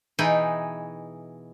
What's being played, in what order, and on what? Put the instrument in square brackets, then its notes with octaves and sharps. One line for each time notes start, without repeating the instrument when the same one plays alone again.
[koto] B2 E3 D#4 G#4 G5